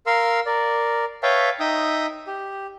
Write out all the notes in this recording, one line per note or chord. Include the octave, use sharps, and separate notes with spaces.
A#4 F5 C6 E6
A#4 D5
B4 C#5 E5 F5 G5 A5
D#4 E5 G5 D#6
G4